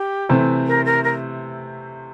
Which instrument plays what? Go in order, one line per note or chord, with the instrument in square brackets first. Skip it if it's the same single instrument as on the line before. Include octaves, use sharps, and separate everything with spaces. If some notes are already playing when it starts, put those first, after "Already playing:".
Already playing: [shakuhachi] G4
[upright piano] C3 E3 A3 C4
[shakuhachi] A#4
A#4
A#4